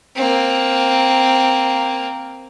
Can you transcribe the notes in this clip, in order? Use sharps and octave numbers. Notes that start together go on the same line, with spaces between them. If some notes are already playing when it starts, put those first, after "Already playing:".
A#3 C4